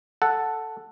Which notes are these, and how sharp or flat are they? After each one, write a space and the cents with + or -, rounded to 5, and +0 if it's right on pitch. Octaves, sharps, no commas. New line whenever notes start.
A4 +0 F#5 +0